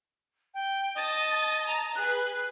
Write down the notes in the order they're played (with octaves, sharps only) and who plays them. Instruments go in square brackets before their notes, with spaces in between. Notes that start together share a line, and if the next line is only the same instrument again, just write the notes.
[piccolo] G5
[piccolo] D#5 [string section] A5 A6
[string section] A5 A#5
[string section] G#4 B4 [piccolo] F#6